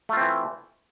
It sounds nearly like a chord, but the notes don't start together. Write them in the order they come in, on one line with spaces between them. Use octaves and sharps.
A3 F4 C4 E3